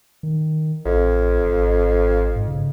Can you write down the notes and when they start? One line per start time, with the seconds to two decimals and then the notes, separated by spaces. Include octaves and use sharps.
0.23 D#3
0.85 A1 F2
1.44 G#1
2.36 G#2
2.48 C#3